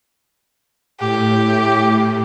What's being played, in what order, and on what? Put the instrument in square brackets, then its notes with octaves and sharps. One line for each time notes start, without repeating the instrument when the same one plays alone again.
[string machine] A2 [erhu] G4